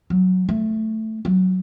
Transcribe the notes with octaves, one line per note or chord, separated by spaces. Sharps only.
F#3
A3
F#3